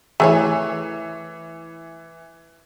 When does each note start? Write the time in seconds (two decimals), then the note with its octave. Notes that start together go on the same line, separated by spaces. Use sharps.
0.20 E3 A3 G#4 C#5